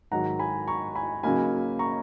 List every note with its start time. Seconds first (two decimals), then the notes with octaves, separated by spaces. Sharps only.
0.11 G#2 D#3 F#3 F#5 A#5
0.39 G#5 B5
0.68 A#5 C#6
0.95 G#5 B5
1.23 C#3 F#3 A#3 D#4 G#5 B5
1.79 A#5 C#6